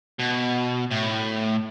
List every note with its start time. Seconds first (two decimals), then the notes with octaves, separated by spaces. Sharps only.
0.19 B2
0.91 A2